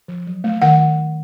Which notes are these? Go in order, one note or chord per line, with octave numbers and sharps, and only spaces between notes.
F3
F#3
A3
D#3 F#5